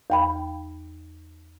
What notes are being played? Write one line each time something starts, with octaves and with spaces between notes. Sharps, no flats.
E2 G5 B5